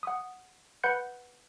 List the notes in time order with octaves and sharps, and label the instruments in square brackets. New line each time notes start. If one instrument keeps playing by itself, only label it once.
[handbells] F#5 D#6
B4 F#5 B5 F#6 G6 C#7